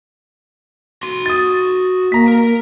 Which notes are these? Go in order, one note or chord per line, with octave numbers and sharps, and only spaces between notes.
F#4 C6
D#6 A6
A#3 A#5 B6
A#4